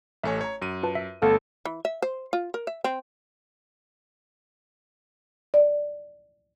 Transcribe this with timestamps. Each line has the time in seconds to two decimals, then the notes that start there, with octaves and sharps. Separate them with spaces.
0.24 A1 A3 C#5 E5 G#5
0.41 C#5 A#5 G#6
0.62 F#2 D#7
0.83 F4 B4 A5
0.95 E5
1.22 G1 A3 B3 A4 F5 F6
1.65 E3
1.85 E5
2.02 C5
2.33 F4
2.54 A#4
2.67 E5
2.84 C4
5.54 D5